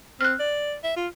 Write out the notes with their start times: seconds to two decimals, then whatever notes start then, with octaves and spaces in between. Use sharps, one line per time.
0.21 C4 F6 F#6
0.40 D5
0.84 E5
0.97 F4